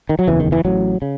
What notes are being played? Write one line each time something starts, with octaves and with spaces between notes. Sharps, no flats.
D#3
F#3
F#1 E2 C#3 E3
D#3
E3
A1 A2 F#3
C#3